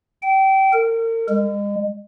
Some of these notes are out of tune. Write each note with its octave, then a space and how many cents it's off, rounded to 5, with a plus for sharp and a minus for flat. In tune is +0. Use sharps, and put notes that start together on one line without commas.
G5 -25
A#4 -40
G#3 -35